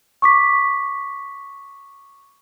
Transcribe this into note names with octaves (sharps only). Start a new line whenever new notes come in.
C#6 D6 B6